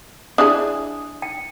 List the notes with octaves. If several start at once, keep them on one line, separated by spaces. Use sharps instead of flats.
D4 E4 G#4 D#6
G5